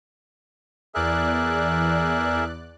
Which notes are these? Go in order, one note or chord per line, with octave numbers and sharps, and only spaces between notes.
E2 G#4 A#4 D5 E5 F#6